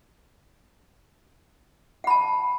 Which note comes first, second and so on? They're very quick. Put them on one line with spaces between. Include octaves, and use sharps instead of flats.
F#5 B5 A5